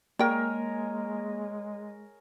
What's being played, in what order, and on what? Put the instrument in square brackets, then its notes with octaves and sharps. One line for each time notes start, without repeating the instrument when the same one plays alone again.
[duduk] G#3 [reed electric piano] A#3 [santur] G#4 A#4 C#5 [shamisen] D5 G5